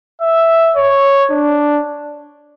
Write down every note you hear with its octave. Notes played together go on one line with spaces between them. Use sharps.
E5
C#5
D4